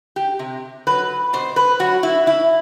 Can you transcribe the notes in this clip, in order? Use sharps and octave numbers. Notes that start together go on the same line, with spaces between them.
G4
C3
F#3 B4
B2 C5
B4
F#3 F#4
E4
B2 E4